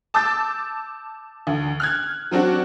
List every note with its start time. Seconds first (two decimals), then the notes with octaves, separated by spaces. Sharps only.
0.14 A5 D6 E6 G6 A6
1.47 D2
1.80 F6 F#6 G#6
2.31 F#3 C4 D4 F#4